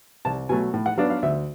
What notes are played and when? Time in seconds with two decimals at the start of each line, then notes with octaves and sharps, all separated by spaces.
0.25 C2 A5
0.49 B2 F#3 A3 G#5
0.74 A2
0.86 F#5
0.98 F#3 B3 D4 F5
1.10 F5
1.23 D2 E5